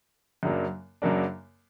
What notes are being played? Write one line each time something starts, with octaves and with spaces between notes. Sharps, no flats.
F#2 C#3 F#3 A#3 D4
F#2 C#3 F#3 A#3 D4